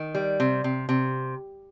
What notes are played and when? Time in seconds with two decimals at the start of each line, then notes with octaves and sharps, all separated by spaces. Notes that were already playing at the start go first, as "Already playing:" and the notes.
Already playing: D#3
0.15 G3
0.40 C3
0.64 C3
0.89 C3